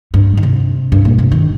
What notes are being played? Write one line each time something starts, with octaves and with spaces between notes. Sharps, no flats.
G2
D#3
C3
G2
A#2
C3
D#3